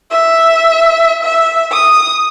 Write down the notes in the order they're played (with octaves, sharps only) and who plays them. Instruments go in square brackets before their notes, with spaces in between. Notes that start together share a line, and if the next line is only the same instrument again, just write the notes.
[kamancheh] E5
E5
D#6